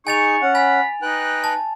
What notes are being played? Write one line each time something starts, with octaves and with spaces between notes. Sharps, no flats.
D#4 G#4 G#5 C#6 A6 F7
C#4 F#5
G#5 B5
D#4 B4 G5 F#6
A5